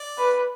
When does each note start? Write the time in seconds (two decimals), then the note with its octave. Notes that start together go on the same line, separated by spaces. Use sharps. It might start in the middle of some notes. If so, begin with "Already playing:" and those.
Already playing: D5
0.18 B4